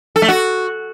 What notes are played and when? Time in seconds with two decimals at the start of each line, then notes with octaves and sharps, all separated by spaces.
0.16 A4
0.22 A3
0.28 F#4